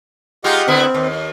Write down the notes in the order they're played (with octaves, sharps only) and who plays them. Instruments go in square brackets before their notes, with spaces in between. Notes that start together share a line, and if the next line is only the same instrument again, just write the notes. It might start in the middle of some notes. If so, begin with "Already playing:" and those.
[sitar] G#3 D#4 F4 [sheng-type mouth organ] G4 D#5 F#5
[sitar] D3 B3 E4 [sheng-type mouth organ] C4
[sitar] D#2